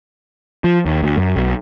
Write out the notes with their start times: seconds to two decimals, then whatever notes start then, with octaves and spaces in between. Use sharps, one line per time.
0.64 F3
0.86 D#2
1.03 D2
1.17 F#2
1.36 B1